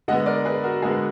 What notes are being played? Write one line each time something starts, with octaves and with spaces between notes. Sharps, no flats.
D3 G#3 B3 D#5 F#5
A#4 D5
G#4 B4
F#4 A#4
D3 G#3 B3 G#4